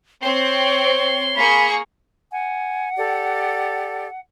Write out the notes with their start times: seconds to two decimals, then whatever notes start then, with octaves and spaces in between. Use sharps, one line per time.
0.23 C4 C#5 C6
1.36 A#3 G#4 B5 C#6
2.32 F#5 G#5
2.96 G4 A4 D5